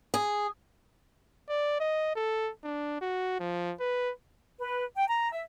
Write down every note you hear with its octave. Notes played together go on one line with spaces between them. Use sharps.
G#4
D5
D#5
A4
D4
F#4
F3
B4
B4
G5
A#5
E5